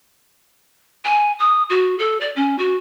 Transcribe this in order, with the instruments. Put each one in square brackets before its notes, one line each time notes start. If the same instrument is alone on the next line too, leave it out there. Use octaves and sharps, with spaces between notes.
[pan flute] G#5
D#6
F#4
A4
D5
C#4
F#4